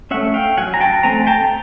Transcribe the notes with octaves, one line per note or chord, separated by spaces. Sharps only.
A3 C#4 E5 F#5
F5 G5
F#3 F#5 G#5
A#5
G5 A5
A3 C4 G#5 A#5
G5 A5